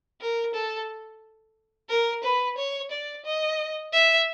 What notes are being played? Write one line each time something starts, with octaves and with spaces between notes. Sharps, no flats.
A#4
A4
A#4
B4
C#5
D5
D#5
E5